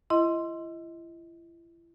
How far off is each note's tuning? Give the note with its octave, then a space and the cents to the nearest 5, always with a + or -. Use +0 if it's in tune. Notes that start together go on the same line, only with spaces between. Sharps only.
E4 +35 D#5 +25 C6 +0